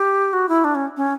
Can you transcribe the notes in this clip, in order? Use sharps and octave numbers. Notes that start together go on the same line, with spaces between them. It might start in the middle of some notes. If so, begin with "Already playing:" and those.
Already playing: G4
F#4
E4
D4
C#4
C#4